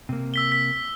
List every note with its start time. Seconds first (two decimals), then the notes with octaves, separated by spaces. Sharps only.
0.09 C3 A#3
0.34 E6 B6 G7
0.52 B6